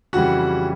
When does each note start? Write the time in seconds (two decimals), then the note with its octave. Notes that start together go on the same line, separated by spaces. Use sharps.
0.13 F2 C#3 E3 G3 F#4 F#5